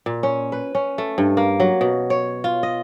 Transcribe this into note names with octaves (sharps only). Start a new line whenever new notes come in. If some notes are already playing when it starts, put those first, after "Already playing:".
A#2
C#4
B4
C#4
A3
G2
A#3
F#3
B2
C#5
F4
D#5